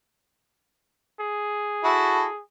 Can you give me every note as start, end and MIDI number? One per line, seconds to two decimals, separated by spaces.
1.20 2.41 68
1.84 2.25 64
1.84 2.25 66
1.84 2.25 69